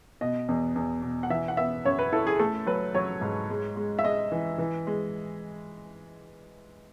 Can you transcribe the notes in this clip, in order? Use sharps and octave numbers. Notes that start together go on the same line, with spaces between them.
B2 D#5
E2
E2
B2
F#5
E3 E5
F#5
B3 E5
F#2 C#5
B4
E4 A4
G#4
A3 A4
F#3 B4
F#3 C#5
G#2
G#3
G#3
E5
G#3 D#5
E3
E3
G#3